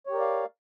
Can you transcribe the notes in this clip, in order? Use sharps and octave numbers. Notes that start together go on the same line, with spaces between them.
G4 A#4 C#5 D5 F5